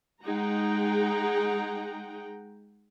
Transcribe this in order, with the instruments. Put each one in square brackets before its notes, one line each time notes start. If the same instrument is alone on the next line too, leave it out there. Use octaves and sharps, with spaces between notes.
[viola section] G#3 D#4 G#4 F#5 G5 A#5